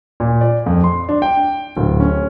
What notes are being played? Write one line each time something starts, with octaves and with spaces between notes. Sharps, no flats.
A#2
D5
F2
C6
D4
G5
D1
C#4